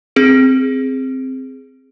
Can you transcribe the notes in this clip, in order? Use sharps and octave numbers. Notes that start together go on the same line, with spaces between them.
C4 G#4 D7